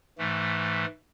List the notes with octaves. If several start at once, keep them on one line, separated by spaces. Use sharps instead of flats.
G#2 E3 A3